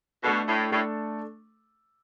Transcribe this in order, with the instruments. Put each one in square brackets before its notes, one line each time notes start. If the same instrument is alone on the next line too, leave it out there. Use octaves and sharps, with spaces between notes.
[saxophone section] B2 [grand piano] A3 D4 A4
[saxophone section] A2
[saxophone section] A2 [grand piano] A3 D4 A4